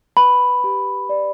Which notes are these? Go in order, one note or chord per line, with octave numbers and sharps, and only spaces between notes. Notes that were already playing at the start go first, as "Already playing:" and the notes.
B4 B5
G4
D5